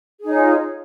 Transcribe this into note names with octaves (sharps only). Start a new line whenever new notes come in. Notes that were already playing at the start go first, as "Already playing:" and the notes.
D#4 F4 G#4 C#5